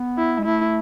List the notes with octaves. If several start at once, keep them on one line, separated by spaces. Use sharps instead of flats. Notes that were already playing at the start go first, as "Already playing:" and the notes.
Already playing: B3
E4
G#3
A3 E4